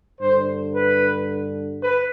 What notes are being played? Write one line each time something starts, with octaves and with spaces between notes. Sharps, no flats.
G2 D3 C5
B4
B4